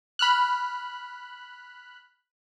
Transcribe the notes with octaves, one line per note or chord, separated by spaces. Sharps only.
B5 F6 F#6